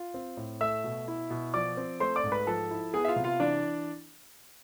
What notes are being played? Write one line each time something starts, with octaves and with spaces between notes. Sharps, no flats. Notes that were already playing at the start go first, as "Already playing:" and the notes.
Already playing: F4
C4
A2
A3 E5 E6
B2
E4
B2
F3 D5 D6
C4
A3 C5 C6
D5 D6
G#2
B4 B5
F3 A4 A5
E4
B3 G#4 G#5
E5
F4 F5
C3
F4 F5
E3 D4 D5